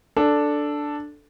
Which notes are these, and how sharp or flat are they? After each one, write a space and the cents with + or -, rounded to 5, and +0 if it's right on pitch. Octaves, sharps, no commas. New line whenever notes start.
D4 +0 A4 +0